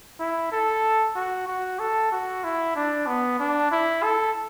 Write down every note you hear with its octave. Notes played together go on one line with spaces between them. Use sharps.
E4
A4
F#4
F#4
A4
F#4
E4
D4
B3
D4
E4
A4